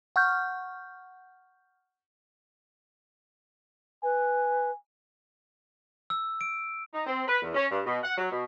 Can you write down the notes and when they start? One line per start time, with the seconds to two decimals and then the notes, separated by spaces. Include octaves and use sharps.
0.16 F#5 C#6 F6 G6
4.03 B4 G#5
6.10 E6
6.41 D7
6.93 D#4
7.06 C4
7.26 B4
7.42 E2
7.54 C#4
7.71 G2
7.85 B2
8.02 F#5
8.17 F#3
8.31 B2